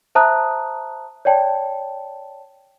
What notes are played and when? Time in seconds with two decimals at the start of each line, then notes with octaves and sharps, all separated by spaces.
0.15 C5 E5 A5 A#5 D#6 F#6
1.25 C#5 D5 G5 A5